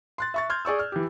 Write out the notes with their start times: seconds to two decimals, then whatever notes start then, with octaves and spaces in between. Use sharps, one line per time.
0.18 C6 F#6 A6
0.34 E5 C#6 A6
0.50 C6 F6 G6 G#6
0.65 G#4 D5 C#6 E6
0.79 F6
0.92 E3 G4